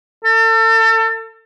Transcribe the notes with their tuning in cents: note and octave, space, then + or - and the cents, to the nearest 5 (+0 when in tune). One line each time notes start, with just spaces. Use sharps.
A4 +35